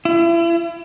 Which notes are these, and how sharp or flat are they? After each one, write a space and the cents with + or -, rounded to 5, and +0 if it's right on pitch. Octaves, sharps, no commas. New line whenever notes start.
E4 +35